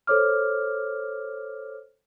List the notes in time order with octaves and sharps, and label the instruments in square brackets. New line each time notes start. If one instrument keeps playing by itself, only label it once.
[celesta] A4 C5 C#5 D6 F6